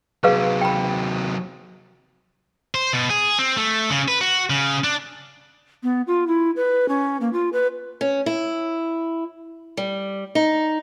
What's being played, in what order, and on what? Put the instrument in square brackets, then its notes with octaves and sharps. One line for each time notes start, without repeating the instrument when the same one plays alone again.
[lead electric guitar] C3 F#3 [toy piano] G#4 B4 F5
[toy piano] G5 B5
[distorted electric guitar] C5
B2
G#4
C4
A3
C#3
B4
F#4
C#3
D4
[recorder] B3
F4
E4
B4
C#4
A#3
F4
B4
[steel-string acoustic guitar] C#4
E4
G3
D#4